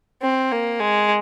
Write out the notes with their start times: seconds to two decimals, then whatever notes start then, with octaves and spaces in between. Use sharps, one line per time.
0.22 C4
0.52 A#3
0.80 G#3